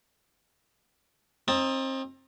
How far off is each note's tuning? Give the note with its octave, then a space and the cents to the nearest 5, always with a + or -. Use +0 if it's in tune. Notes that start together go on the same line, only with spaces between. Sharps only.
C4 +30 D#4 +0 A5 +0